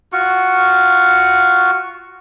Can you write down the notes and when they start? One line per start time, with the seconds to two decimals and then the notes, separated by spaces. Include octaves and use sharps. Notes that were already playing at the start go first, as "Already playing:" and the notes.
0.13 F4 F#4 C#6